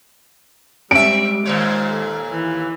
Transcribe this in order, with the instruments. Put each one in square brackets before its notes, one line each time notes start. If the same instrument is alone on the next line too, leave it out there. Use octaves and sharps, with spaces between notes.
[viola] G3 [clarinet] G#3 [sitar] C4 E5 [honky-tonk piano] D7
[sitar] D#2 A#2 C#5 [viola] C5
[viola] A4
[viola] E3 [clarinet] E4